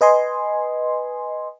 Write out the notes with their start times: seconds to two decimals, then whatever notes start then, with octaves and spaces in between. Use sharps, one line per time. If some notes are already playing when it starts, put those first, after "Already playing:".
0.01 B4 D#5 G#5 C6